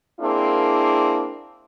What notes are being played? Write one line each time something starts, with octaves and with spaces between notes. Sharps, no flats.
A#3 C4 D4 E4 G#4